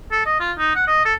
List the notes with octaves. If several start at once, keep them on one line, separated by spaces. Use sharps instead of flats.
A4
D#5
F4
D#4
F#5
D#5
A4